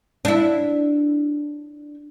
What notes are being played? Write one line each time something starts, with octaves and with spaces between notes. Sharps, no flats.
D4 E4